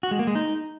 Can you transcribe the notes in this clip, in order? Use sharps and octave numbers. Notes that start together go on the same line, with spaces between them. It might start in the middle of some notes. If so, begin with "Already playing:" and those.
F#4
G#3
A#3
G#3
D#4